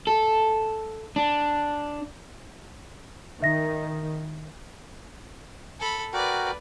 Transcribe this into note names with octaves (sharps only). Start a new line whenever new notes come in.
A4
D4
D#3 E5 A#6
A4 B5
F#4 A#4 B4 D5 G5